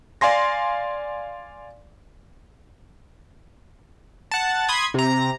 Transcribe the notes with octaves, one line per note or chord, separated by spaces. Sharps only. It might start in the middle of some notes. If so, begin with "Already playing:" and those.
D5 F5 G#5 C6 A#6
F#5 A5
B5 C6 D#6 G#6
C3 A#5